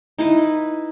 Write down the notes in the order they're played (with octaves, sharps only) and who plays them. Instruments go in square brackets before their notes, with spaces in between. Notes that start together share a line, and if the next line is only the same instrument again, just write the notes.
[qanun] D#4 E4 B4